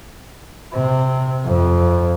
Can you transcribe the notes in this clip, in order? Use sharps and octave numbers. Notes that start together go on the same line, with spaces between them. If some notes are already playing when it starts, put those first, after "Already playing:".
C3
F2